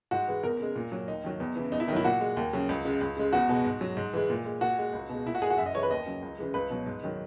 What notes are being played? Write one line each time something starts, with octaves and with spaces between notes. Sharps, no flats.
G#2 F#4
E3 G#3
E2 A#4
C#3 G#3
A#2
F#3
D#2 D#4
D#3 F#3
E2
C#3 E3
E2 D#4
E4
D#3 F#3 D#4 E4
A#2 F#4
G#3
D#2
C#3 F#3
C#2
C#3 G#3
C#2
C#3 G#3
E2 F#4
B2 G#3
G#2
F#3
G#2
E3 G#3
A#2
G#3
A#2 F#4
G#3
C#2
B2 G#3
A#2 E4
F#4
G#3 G#4
F#4
F#2 E5
D#5
E3 G#3 C#5
B4
D#2 D#5
C#3 F#3
C#2
C#3 E3 G#3
C#2 B4
B2 F#3
G#2
D#3 F#3